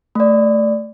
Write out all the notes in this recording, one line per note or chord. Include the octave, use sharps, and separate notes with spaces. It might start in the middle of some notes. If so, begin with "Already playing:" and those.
A3 D5